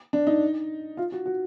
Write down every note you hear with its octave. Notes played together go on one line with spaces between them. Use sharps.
D4
D#4
F4
F#4
F#4